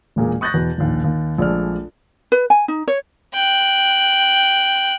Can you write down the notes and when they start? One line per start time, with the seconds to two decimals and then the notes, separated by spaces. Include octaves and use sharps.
0.16 E1 A#2 A#3 G#4
0.41 C#6 D#6 F#6 G6 A6 A#6
0.54 E2 B2
0.78 A#1 D#2 A#2
1.04 D#2
1.38 A#1 G#3 A3 A4 D5 F6
2.32 B4
2.50 G#5
2.68 D#4
2.88 C#5
3.34 G5 F#6